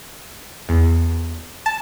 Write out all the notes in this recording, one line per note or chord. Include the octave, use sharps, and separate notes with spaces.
E2
A5